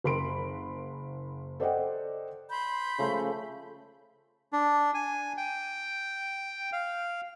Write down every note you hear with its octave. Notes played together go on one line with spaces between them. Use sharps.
F#1 A#4 B5 C6 D7
A4 C5 D5 D#5 F#5 G5
B5 C6 G6
C#3 F3 A3
D4
G#5
G5
F5